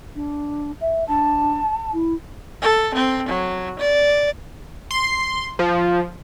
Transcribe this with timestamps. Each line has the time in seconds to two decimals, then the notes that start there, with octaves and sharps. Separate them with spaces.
0.16 D4
0.81 E5
1.08 D4 A5
1.93 E4
2.62 A4
2.94 C4
3.28 F#3
3.79 D5
4.91 C6
5.59 F3